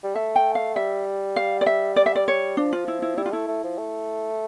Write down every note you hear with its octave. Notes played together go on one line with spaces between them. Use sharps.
G3
A3 E5
G5
F5
G3 E5
F5
D5
E5
D5
E5
D5
C#5
F3 D4
F4
E4
E4
G3 E4
F4
A3 E4
A3
F3
A3